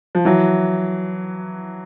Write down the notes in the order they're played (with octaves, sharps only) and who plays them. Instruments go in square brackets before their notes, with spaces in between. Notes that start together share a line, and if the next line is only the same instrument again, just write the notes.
[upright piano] F3
E3 F#3